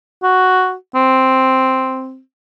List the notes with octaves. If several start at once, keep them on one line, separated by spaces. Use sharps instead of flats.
F#4
C4